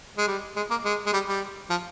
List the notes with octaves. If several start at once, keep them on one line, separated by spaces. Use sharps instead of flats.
G#3
G3
G#3
A#3
G#3
G#3
G3
G3
F3